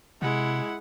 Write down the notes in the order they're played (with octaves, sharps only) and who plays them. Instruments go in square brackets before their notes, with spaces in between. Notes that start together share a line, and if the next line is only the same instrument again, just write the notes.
[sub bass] C3 [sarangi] G#3 [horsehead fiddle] E4 F#5